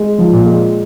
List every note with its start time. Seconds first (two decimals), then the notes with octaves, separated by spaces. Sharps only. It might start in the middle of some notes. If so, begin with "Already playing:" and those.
Already playing: G#3
0.19 F3
0.32 A#2
0.46 G#3